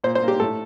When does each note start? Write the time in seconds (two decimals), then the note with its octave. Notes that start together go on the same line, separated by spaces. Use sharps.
0.04 A#2 C5
0.15 C5
0.23 A#3
0.28 G4
0.40 A2 A4